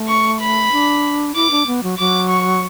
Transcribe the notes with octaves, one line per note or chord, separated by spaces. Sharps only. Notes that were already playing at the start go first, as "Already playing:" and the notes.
Already playing: A3
C#6
B5
D4
E4 D6
D4
B3
F#3
F#3 D6
C#6